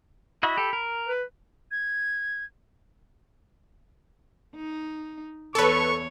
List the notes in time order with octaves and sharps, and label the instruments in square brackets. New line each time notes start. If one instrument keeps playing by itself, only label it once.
[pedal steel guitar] E4 F#4 D#5 [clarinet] B5
[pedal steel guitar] G4 A4
A#4
[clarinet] B4
[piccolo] G#6
[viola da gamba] D#4
[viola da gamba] E2 C#5 [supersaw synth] A4 B4 [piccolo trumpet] C#6